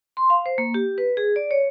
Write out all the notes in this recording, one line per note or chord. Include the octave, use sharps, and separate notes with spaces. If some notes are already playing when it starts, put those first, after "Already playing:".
C6
F5
C5
A#3
G4
B4
G#4
D5
C#5